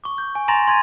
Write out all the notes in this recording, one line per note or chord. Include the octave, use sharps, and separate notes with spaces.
C#6 D6
G6
G#5
G#5 A#5 C6 A6 A#6 F7
C6 G#6 A6 D#7